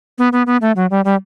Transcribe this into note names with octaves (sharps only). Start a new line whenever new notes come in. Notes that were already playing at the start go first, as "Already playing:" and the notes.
B3
B3
B3
A3
F#3
G3
G3